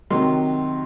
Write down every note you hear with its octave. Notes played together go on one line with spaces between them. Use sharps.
C3 D#3 F#3 C6